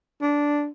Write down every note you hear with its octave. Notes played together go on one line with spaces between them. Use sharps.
D4